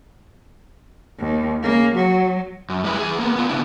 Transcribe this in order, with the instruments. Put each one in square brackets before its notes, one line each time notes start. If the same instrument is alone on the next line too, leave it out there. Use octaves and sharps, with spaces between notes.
[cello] D#2
[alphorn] C#3 [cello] A#3
[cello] F#3 [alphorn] F#4
[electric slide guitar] F#2
G3 G#3 E4 B4
E3 G#4
A#3 B3
B3 F4
C#3 B3 D4 E4